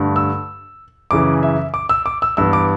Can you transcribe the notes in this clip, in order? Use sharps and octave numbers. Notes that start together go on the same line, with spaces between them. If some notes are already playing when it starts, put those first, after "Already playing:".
Already playing: G2 D3 A3
E6
F#2 C#3 E3 D6
E5
D6
E6
D6
E6
G2 E3 B3 E6
D6